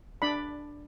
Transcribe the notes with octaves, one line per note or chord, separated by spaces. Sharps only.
D4 D5 B5